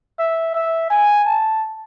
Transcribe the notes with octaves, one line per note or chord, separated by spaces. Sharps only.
E5
E5
G#5
A5